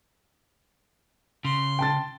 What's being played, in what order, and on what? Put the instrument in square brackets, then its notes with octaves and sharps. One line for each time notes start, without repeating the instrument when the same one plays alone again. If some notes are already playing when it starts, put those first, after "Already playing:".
[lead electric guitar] C#3 [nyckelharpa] C6
[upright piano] G5 A5 A6